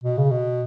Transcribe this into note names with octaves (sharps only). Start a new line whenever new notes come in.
B2
C#3
B2